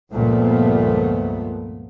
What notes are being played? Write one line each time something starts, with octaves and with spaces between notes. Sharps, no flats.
C#2 G2 A#2 F3 A3 B3